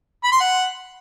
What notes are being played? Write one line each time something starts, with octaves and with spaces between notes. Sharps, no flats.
B5
C6
F#5